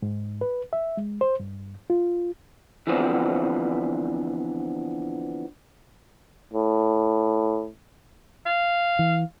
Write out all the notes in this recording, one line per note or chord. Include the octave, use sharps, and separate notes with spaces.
G#2
B4
E5
G#3
C5
G2
F4
D3 E3 F3 B3 C4 D4
A2
F5
E3